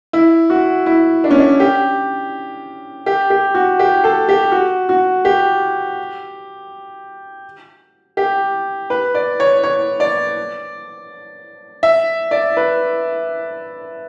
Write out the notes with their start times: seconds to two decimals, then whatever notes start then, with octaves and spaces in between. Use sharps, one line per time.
0.13 E4
0.50 F#4
0.86 E4
1.24 D4
1.31 C#4
1.38 D4
1.60 G4
3.06 G4
3.30 G4
3.54 F#4
3.79 G4
4.04 A4
4.29 G4
4.52 F#4
4.89 F#4
5.25 G4
8.17 G4
8.90 B4
9.15 D5
9.40 C#5
9.63 C#5
10.00 D5
11.83 E5
12.31 D5
12.57 B4